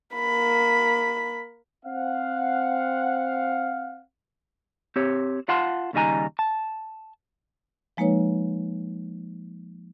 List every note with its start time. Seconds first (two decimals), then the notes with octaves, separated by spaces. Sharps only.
0.15 A#3 B5
1.85 C4 F5 F#5
4.96 C4 G4 C#5
5.49 F4 F5 F#5 A5 C6
5.93 D#2 C#3 G3 D#4 G#5 A#5
6.39 A5
7.97 F3 G#3 A#3 D#4 B4 C#5